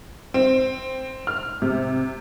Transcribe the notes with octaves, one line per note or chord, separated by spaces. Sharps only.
C4
F6
C3